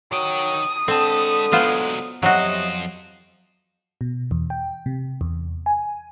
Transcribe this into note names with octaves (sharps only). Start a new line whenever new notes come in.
D#3 F#3 G5 D#6
D3 G#3 C4 A5
F#3 G#3 B3 F4 C5
F2 C3 F#3 F#4 C5 D#5
B2
E2
G5
C3
E2
G#5